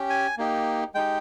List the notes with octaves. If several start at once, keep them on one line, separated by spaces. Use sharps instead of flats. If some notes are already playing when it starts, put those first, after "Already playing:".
Already playing: C#4 G4
G#5
A#3 D#4 G4
G#3 D#4 G4 G5